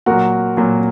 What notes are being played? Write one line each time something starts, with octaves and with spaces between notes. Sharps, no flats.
A#2 F#3 F#4 A#4
A#2 F#3